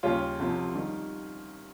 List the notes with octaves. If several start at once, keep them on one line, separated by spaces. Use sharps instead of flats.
D#2 C#3 G3 C#4 F4
C2 C3 F3
D#3 G3